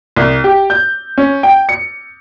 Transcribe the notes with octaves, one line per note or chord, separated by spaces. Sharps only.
C2
G4
G6
C#4
G5
C#7